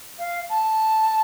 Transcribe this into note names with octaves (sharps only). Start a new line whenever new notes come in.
F5
A5